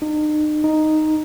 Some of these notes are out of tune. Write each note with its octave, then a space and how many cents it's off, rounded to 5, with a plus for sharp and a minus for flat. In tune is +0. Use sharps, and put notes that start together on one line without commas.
D#4 -40
D#4 -5